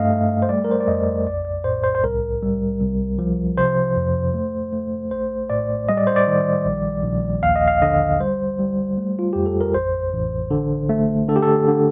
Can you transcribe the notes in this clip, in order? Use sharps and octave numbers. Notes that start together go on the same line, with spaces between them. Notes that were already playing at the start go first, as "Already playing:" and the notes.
Already playing: G2 A3 D#5 F5
A3
C5
G3 D5
A#4
C5
D5
F2 D#5
A#1 D5
D5
A2 C5
C5
C5
C2 A#4
G3
C2
F3
C3 C5
F2
A3
A3
A#1 C5
A2 D5
G3 D#5
D5
C5
D5
D#3
A#1
A#1
D#2 F5
D#5
F5
D3 D#5
G3 C5
G3
A3
F4
F2 G4
A4
A#4
A1 C5
A1
D3
A3
D3 A4
G4
A4
D3